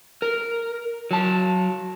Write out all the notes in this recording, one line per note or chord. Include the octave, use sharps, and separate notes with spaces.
A#4
F#3 A5